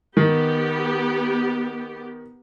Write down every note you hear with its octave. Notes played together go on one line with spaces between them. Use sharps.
D#3 B3 G4